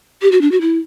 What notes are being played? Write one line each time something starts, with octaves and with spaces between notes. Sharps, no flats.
G4
F#4
D4
F#4
E4